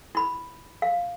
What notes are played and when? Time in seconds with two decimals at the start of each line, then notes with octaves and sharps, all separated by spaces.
0.15 E4 B5
0.82 F5